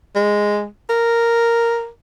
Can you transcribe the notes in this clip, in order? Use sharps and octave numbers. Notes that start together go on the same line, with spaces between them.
G#3
A#4